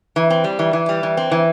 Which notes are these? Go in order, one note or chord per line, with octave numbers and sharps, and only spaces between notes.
E3
C4
G3
E3
E3
G3
E3
C4
E3